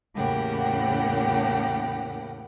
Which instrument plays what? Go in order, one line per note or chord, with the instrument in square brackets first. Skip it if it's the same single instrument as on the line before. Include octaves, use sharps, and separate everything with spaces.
[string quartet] E2 A2 C#3 A#3 G4 F#5